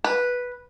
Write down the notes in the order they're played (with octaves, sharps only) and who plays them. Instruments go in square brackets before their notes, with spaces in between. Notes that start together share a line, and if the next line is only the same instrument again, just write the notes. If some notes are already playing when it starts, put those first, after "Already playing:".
[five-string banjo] B4